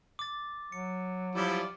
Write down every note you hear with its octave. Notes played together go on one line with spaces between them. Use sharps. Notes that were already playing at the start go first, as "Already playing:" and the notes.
D6 A6
F#3 C#7
F3 G3 E4 D5